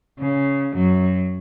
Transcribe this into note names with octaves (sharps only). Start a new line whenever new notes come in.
C#3
F#2 F#3